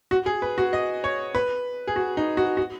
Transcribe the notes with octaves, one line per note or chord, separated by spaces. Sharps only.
F#4
G#4
B4
F#4
D#5
C#5
B4
G#4
F#4
D#4
F#4
F#4